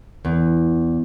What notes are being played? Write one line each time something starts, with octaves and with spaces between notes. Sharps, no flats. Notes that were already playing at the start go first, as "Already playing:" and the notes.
E2